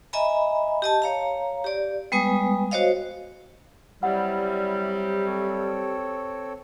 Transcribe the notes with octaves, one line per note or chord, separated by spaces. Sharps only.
D#5 E5 G#5 A#5 B5
G4 D#5 A5
C#5 F5 A#5
G4 D5
G3 G#3 B3 B4 G#5 D#6
F#4 C5 C#5 D#5 F5
C3 F#3 G3 E4 G4 F#5
C4 A4 C#5